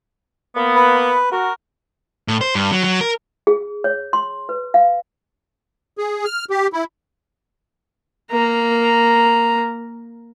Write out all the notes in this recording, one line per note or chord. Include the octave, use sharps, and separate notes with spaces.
A#3 B3
B4
F#4 A#4
A2
C5
G2
F#3
F#3
A#4
G#4
C#5
C6
B4
F5
G#4
F6
G4
E4
A#3 A#5